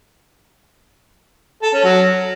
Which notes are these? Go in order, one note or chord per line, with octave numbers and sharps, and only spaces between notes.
A4
C#4
F#3